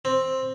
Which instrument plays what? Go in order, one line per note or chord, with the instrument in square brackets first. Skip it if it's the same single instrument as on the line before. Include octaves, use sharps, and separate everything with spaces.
[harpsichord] C4